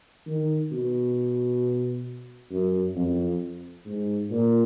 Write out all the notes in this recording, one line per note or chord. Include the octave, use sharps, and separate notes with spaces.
D#3
B2
F#2
F2
G#2
A#2